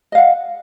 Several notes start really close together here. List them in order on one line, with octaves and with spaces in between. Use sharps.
D#5 F5 F#5